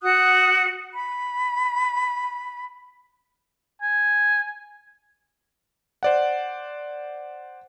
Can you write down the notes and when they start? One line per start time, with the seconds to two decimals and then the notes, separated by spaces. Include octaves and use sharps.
0.03 F#4 F#5 D#6 F#6
0.93 B5
3.82 G#5
6.03 C5 D5 F#5